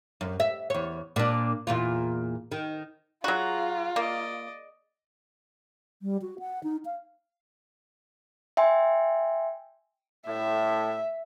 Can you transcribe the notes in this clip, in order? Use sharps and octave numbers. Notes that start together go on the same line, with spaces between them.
F#2
E5
E2 C#5
A#2 D4
E2 A#2 F4
D#3
F#3 F4 F#4 G#4 A#5
A#3 D5 D#5
G3
F#4
F#5
D#4
F5
E5 G5 G#5 C6
A2 E5